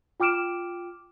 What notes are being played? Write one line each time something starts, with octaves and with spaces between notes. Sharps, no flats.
F4 G5 D6 F6 D7 E7